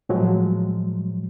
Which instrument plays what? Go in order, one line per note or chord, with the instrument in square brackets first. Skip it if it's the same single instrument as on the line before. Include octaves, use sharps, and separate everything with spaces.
[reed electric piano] A2 F3 F#3 G#3